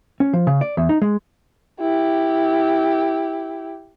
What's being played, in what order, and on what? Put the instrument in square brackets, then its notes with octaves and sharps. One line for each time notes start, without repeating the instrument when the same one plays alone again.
[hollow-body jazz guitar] C#4
F3
C#3
D5
E2
D#4
G#3
[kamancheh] E4 G4